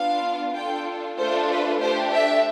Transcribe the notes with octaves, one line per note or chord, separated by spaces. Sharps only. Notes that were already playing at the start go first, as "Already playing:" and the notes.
Already playing: B3 D4 F4 F5
D4 F4 A4 G5
A3 D4 F4 A4 C5
B4
A3 D4 G4 C5
E5